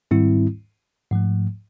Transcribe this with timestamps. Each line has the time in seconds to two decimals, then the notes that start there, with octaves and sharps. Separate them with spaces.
0.11 G#2 D#3 G3 C4 E4
1.11 G#2 F3 A3